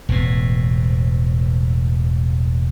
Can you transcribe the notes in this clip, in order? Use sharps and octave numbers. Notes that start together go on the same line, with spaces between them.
E1 A2